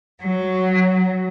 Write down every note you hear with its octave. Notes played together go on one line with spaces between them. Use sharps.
F#3